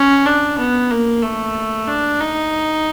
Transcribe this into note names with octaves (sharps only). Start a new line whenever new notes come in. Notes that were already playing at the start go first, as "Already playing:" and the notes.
Already playing: C#4
D4
B3
A#3
A3
D4
D#4